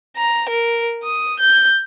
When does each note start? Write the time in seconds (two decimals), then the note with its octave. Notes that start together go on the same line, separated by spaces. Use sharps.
0.17 A#5
0.49 A#4
1.03 D#6
1.40 G6